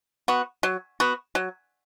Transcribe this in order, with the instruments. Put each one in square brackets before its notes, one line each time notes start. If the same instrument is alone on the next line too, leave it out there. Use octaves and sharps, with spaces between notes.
[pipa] B3 F#4
F#3
B3 F#4
F#3